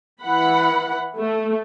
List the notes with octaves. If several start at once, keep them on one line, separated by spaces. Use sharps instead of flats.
E3 F#5 B5
A3